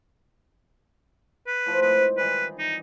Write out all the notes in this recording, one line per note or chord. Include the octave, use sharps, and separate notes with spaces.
B4
A2 F3 C6
G#2 C3 D#4 B4
D#3 E3 G3 B4
D#4